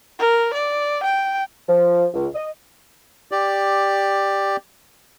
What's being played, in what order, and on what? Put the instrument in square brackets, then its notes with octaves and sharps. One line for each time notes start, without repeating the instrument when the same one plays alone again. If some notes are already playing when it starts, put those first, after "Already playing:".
[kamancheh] A#4
D5
G5
[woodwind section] F3
C#2
D#5
[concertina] G4 D5